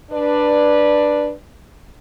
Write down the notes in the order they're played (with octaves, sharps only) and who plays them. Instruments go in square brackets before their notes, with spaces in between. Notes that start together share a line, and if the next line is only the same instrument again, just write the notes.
[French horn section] D4 B4 D5